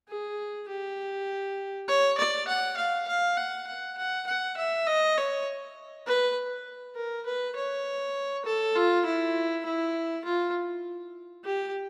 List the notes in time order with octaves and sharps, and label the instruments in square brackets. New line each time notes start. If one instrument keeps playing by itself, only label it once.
[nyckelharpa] G#4
G4
C#5
D5
F#5
F5
F5
F#5
F#5
F#5
F#5
E5
D#5
C#5
B4
A#4
B4
C#5
A4
F4
E4
E4
F4
G4